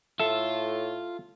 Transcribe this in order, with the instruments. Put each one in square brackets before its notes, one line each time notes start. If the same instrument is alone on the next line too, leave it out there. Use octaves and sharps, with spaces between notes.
[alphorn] A2 [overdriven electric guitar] F4 [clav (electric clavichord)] A4 E5